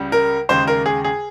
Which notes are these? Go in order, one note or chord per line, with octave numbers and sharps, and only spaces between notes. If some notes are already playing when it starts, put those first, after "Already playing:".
Already playing: C#2 C#3 G3
A#4
D#2 C#3 G#3 C5
A#4
G#4
G#4